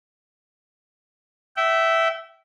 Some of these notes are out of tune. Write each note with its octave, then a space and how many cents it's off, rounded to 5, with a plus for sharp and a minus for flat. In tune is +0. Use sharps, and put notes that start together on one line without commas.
E5 +0 G5 -35